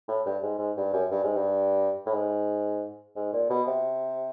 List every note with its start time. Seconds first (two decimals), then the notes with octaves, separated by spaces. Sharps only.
0.08 A2
0.25 G2
0.43 G#2
0.59 G#2
0.77 G2
0.93 F#2
1.11 G2
1.23 G#2
1.36 G2
2.06 A2
2.13 G#2
3.16 G#2
3.33 A#2
3.50 B2
3.67 C3